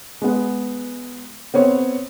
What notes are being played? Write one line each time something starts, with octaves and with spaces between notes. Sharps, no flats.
G#3 B3
B3 C4 C#5